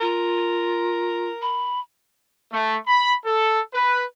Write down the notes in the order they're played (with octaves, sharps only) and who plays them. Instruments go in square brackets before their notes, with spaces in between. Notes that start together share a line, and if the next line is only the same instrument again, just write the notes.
[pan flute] F4 [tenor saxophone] A#4
[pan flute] B5
[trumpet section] A3
B5
A4
B4